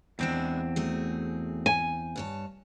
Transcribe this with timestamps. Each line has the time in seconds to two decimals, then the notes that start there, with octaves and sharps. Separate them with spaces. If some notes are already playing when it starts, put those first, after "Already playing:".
0.19 E2 G#3 C4 D4 E4
0.76 F#3 A3 G#4
1.66 G#5
2.16 G2 C#5 A5